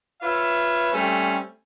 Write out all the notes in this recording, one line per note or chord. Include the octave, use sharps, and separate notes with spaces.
F4 B4 C#5 E5
G3 A3 C4 C#4